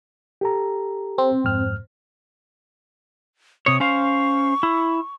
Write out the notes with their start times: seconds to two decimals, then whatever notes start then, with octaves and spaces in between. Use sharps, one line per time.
0.41 G4 A4 A#5
1.18 C4
1.44 F2 G#2 F6
3.66 C3 C#5 D#6
3.80 C#4 C5 F5 C#6
4.63 E4